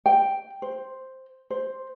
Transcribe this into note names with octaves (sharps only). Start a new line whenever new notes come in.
G5
C5
C5